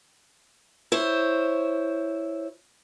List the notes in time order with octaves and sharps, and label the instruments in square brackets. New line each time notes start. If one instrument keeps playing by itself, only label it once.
[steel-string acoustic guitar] E4 C5 C#5